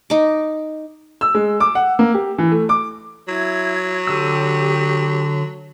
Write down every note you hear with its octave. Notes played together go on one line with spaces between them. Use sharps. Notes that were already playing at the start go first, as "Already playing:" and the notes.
D#4 D6
E6
G#3
D6
F#5
A#3
G4
E3
A3
D6
F#3 E4 G#6
D3 G4 E6